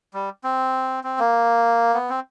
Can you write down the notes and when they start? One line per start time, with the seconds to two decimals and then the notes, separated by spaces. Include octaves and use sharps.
0.14 G3
0.44 C4
1.04 C4
1.19 A#3
1.94 B3
2.10 C4